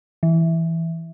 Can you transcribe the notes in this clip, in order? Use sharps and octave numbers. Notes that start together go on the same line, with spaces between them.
E3